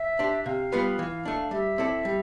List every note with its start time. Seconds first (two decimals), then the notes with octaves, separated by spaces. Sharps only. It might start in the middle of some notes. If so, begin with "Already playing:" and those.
Already playing: E5
0.19 D4 G4 C5
0.45 C3 F5
0.72 G3 B3 F4 B4
0.99 E3
1.25 A3 D4
1.51 G3 E5
1.78 C4 E4 A4 D5
2.05 G3